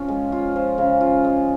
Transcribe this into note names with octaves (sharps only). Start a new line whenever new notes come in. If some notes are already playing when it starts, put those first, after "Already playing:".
Already playing: F3 C#4 F4
G#3
F4
F3
C#3
F4
G#3